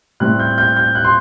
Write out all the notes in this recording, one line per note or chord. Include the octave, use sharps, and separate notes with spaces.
A2 G3 C4 F#6
G6
G6
G6
F#6
C6